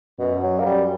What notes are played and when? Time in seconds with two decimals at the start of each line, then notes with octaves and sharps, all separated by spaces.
0.19 F#2 B2
0.43 F#3
0.59 A#3
0.66 F#2 G3